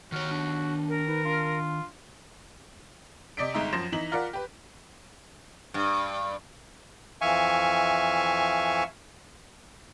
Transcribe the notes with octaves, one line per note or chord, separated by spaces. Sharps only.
D#3 F#4 C#5 F6
D4
A#4
D#4 B4
D4 F4
C3 D5 D#5 B6 D7
G1 G#3 D#4 E5 A#5
F#2 F3 C6 A#6 E7
E3 D#4 B6 F#7
F4 A#4 D5 F#5
G4 B4
G2
F2 E3 E5 F5 G#5 C#6